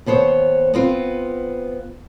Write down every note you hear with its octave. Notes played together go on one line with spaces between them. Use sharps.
D#2 B3 C5 C#5
B3 C4 F4